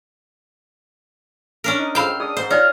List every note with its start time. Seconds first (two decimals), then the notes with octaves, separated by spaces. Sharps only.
1.64 C#4 D4 A#4
1.78 D#4
1.95 F2 G#2 F5 G5 A#5 B5 E6
2.20 D4 G#4 D#6
2.37 G#2 C5
2.50 D#4 F4 C#5 D5 G#5 F6